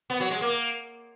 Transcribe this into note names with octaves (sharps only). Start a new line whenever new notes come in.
B3
F#3
G#3
A#3